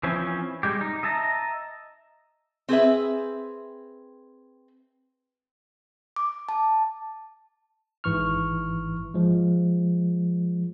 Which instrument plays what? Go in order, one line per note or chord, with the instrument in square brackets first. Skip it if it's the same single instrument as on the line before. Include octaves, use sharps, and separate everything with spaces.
[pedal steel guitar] E3 F3 C4 C#4
G3 G#3 G4
D#4
D#5 E5 A5 A#5
[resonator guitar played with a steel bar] C4 G#4 B4 E5
[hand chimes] D6
A5
[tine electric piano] G#1 G#2 E3 C#6 F6
F3 G#3